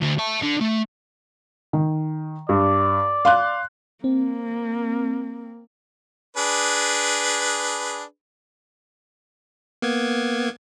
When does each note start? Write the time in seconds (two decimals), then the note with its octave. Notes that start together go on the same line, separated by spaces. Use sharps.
0.01 D2
0.19 E5 A5
0.42 D3
0.61 A3
1.73 D#3
2.49 G2 D5
3.25 F5 C6 F#6
4.04 A#3 C4
6.37 D4 G#4 B4
9.82 A#3 B3 G#6